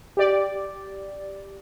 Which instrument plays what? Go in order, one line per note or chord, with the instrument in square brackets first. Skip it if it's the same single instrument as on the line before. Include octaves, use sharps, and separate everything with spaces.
[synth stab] G4 D5